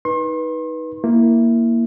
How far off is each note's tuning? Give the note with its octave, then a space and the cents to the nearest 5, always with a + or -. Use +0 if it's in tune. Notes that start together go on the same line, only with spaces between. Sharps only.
D#4 +15 B4 -15 C6 +40
A#3 +0 E4 +0